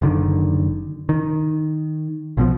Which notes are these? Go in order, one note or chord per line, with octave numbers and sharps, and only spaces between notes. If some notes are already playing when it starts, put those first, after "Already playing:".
F#1 D3 D#3
D#3
B1 B2 F3